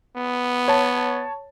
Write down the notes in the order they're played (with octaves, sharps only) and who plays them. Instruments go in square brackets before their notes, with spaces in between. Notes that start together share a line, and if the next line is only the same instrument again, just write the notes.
[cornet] B3
[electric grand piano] C#5 A5